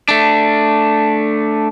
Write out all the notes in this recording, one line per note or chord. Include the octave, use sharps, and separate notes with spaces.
A3 D4